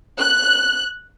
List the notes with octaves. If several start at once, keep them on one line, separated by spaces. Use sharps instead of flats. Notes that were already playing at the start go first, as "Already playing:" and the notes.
F#6